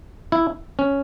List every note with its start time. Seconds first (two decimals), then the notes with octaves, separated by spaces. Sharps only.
0.32 E4
0.79 C#4